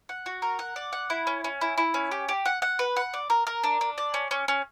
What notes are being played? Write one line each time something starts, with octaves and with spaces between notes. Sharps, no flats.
F#5
F#4
A#4
F#5
D5
F#5
E4
C#4
C#4
E4
E4
C#4
G4
G4
F#5
F#5
B4
F#5
D5
A#4
A#4
D4
D4
D5
C#4
C#4
C#4